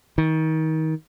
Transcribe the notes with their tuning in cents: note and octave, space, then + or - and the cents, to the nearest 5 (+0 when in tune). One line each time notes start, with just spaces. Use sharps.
D#3 +30